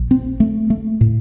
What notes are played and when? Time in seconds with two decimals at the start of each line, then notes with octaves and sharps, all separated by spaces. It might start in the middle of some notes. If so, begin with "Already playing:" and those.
Already playing: A#1
0.11 C4
0.40 A3
0.70 A3
1.01 A2